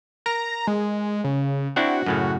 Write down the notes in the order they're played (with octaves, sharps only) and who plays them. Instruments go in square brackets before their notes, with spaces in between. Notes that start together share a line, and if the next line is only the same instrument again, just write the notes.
[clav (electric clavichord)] A#4 [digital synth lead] A#5
[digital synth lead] G#3
C#3
[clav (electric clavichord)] C4 D4 E4 [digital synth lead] F#4
[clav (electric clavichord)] F#2 A2 C#3